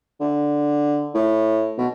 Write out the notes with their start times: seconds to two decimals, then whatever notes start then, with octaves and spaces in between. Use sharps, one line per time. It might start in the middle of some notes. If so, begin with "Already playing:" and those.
0.20 D3
1.15 A2
1.78 B2